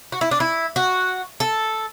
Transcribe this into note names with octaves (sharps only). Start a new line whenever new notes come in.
F#4
E4
D4
E4
F#4
A4